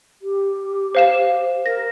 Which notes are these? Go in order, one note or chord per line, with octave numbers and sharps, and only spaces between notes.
G4
C5 F5 E7
A#4 A#6